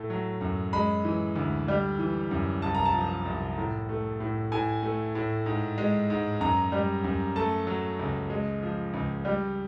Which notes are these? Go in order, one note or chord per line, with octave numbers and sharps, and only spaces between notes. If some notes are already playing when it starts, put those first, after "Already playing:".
Already playing: A2 A3
F#3
F#2
G#3 B5
E3
D2
G3
E3
F#2
C2 A5
A#5
A5
F3
C2
A2
A3
A2
A2 G#5
A3
A2
G#2
G#3
G#2
F#2 A#5
G3
F#2
A3 A5
F#3
C#2
G#3
F3
C#2
G3